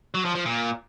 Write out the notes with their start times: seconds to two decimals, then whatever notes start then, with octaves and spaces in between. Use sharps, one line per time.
0.14 F#3
0.25 F3
0.35 F3
0.45 A#2